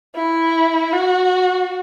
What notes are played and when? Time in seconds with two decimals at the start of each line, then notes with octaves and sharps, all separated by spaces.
0.16 E4
0.93 F#4